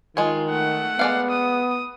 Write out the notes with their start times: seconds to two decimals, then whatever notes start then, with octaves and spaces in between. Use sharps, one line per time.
0.17 D#3 G#3 F4 C#5
0.50 A3 F#5
0.99 G#3 B3 D5 F5
1.30 D#6